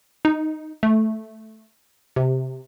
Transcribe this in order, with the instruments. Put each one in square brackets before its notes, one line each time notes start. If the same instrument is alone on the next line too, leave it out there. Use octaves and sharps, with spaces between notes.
[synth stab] D#4
A3
C3